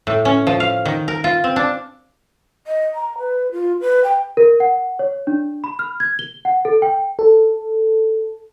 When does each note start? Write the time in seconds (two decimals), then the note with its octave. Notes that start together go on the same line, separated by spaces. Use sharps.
0.07 A2
0.25 C#4
0.47 F3
0.60 F5
0.85 D#3
1.08 A#4
1.24 F4
1.44 C4
1.56 D4
2.67 D#5
2.95 A#5
3.18 B4
3.52 F4
3.81 B4
4.04 G5
4.37 A#4
4.60 F#5
4.99 C#5
5.27 D4
5.64 B5
5.79 F6
6.00 G#6
6.19 G7
6.45 F#5
6.65 A4
6.82 G5
7.19 A4